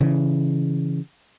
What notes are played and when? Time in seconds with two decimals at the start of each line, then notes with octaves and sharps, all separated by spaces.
0.01 C#3 E3